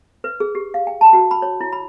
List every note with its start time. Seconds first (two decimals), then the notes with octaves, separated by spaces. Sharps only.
0.24 B4
0.40 G#4
0.55 G4
0.74 F5
0.87 G5
1.01 A5
1.13 F#4
1.31 B5
1.42 C#5
1.61 E4
1.72 B5